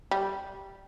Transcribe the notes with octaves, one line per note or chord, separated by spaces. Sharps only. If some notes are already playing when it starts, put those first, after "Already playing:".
G3